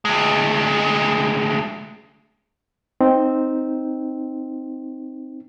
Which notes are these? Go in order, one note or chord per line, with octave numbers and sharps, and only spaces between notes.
D2 G#3
C4 D#4